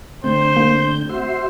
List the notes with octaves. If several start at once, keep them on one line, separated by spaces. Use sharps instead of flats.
D3 A3 C4 C5 G6
A#3
F#4 C5 E5 C6